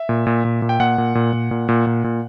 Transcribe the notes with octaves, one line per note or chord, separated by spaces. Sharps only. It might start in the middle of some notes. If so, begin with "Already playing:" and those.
Already playing: E5
A#2
A#2
A#2
A#2
G5
A#2 F#5
A#2
A#2
A#2
A#2
A#2
A#2
A#2